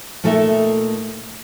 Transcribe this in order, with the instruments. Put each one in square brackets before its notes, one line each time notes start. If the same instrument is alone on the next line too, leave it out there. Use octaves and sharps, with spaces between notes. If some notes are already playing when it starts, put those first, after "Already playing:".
[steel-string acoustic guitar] A#2 A3 D#4 A4 A#4 E5